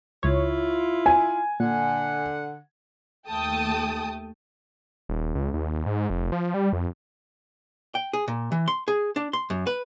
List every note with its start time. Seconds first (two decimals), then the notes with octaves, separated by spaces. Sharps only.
0.23 C#2 E4 F4 C#5
1.06 G#5
1.60 A#2 D3 F#5
3.29 D#2 A3 G5 A5 D#6
5.09 D#1
5.35 C#2
5.54 D#2
5.86 G#2
6.10 F1
6.32 F3
6.54 G3
6.73 F2
7.95 G5
8.13 G#4
8.28 A#2
8.52 E3
8.68 C6
8.88 G#4
9.16 D4
9.33 C6
9.50 F#2
9.67 B4